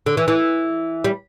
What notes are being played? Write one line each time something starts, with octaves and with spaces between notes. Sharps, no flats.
D3
E3
E3
G3